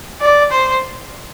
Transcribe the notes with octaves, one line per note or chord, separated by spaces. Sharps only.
D5
C5